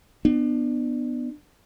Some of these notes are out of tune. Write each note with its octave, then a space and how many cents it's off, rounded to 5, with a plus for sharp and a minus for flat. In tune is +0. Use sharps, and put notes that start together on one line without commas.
B3 +0 D4 +30